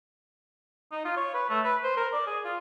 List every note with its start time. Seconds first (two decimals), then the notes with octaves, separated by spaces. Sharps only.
0.92 D#4
1.05 F4
1.17 C#5
1.34 B4
1.50 A3
1.65 B4
1.84 C5
1.97 A#4
2.13 D5
2.27 G#4
2.45 F4